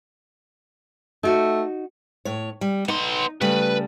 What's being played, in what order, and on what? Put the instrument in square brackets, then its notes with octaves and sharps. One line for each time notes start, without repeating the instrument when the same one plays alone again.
[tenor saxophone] A3 [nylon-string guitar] D#4 F#4
[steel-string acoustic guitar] A2 C#5
G3
[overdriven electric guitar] B3 C6 [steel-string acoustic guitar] D#4
[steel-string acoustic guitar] C#3 G3 A3 [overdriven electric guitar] B4